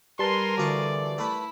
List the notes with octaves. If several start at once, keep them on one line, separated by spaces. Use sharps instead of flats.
G3 A#4 B4 G#5 A5 C6
D2 E3 F4 D5 C#6
A3 E4 B4 B5